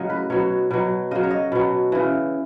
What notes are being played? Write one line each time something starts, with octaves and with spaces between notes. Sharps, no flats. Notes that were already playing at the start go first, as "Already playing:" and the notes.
Already playing: A2 C#3 F#3 D#5
B4
B2 F#3 C#5
B2 F#3
C#3 F#3 D#5
C#5
D#5
B2 F#3
C#3 E3